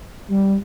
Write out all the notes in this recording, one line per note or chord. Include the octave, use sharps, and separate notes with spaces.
G3